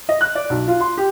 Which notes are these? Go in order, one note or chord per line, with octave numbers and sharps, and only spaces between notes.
D#5
F#6
D5
B1
F4
C6
G4